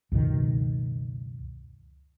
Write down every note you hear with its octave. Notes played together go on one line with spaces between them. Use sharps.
C#2 F#2 B2 D#3